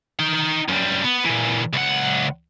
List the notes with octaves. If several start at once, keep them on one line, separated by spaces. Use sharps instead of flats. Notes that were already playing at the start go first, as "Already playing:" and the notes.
D#4 G5
F#2 G3
B3
A#2 E3
C#2 F#5